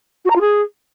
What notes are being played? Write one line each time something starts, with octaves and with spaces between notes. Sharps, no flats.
F#4
A#5
F4
G#4